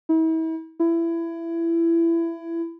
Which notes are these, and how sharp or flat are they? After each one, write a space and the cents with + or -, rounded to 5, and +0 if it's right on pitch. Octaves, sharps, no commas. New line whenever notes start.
E4 -40
E4 +20